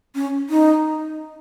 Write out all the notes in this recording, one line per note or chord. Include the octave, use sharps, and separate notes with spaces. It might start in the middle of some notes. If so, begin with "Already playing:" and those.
C#4
D#4